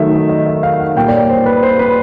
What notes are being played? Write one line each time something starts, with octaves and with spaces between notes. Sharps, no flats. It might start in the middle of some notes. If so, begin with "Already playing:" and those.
Already playing: D#3 F#3 A3 E5
D#5
E5
F5
F#5
A#2 G3 A#3 G5
D5
C#5
C5
B4
C5
B4